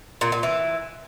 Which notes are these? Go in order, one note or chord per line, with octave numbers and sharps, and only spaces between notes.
A#2
A#2
E3